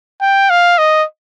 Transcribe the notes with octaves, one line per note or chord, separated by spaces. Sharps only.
G5
F5
D#5